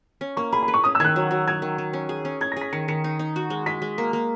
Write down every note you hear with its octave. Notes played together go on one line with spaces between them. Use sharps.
C#4
A#3 C#6
G#4 B5
B5
B4
C#6
C#4 D#6
E6
D#3 F#6 G#6
F#3
F#3
F#3 G#6
D#3
D#3
C#4
G#4
C#4
C#4 G#6
A#6
G#4 B6
D#3 C#7
D#3 C#7
D#4
D#4
F#4
G#3
G#3 B6
G#3
A#3
A#3